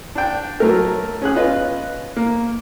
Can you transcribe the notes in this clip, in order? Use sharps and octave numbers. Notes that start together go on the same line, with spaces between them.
D4 G5
F#3 A3 A#4
C#4 G#4 F#6
C#4 F4 B4 D#5
A#3